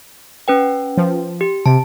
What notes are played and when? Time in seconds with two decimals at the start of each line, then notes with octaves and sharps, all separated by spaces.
0.48 C#4 B4 G5
0.97 F3
1.41 G4
1.66 C3 A5